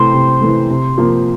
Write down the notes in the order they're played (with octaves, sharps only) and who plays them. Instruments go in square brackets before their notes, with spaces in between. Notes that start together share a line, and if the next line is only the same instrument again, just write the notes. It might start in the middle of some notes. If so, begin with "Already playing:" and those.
Already playing: [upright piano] C3 E3 A3 [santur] C5
[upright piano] C3
E3 A3
C3
F3 A#3